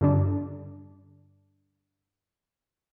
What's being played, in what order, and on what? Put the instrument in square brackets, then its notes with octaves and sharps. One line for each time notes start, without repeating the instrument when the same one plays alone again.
[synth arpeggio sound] G2 D3 D4